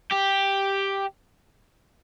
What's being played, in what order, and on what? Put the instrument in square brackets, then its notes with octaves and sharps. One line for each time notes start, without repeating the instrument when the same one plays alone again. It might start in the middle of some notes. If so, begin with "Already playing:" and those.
[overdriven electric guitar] G4